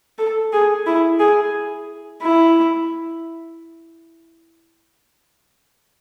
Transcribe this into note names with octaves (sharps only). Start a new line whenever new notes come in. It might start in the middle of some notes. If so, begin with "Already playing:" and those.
A4
G#4
E4
G#4
E4